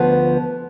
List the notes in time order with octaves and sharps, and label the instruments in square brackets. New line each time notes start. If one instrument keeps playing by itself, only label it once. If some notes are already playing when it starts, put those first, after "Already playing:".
Already playing: [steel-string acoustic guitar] D2 F3 B3